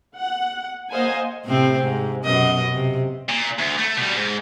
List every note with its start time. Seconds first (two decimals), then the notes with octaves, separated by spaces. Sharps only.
0.18 F#5
0.90 A#3 C5 D#5 F5 F#5 G#5
1.45 A2 C3 C4
1.83 G#2
2.24 F#2 B2 D#5
2.74 C3
3.29 A#2
3.59 D2
3.79 A3
3.98 B2 G3
4.15 G#2